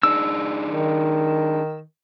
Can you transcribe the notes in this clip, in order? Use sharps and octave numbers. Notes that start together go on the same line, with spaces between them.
D4 D#4 G#4 E6
D#3